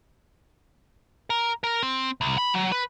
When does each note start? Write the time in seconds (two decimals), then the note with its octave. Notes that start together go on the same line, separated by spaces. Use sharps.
1.30 A#4
1.64 A#4
1.83 C4
2.21 C2
2.38 B5
2.54 F#3
2.72 B4